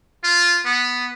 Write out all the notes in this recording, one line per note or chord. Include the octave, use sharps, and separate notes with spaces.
F4
B3